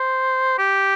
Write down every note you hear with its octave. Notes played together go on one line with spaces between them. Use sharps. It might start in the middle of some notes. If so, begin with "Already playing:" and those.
Already playing: C5
G4